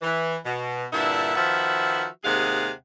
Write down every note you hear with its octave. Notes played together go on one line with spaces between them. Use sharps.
E3
B2
G2 A#2 D3 D4 E4 E5
D#3 F3 F#4 B4 E5
D#2 C3 G#3 G#4 F5 F#5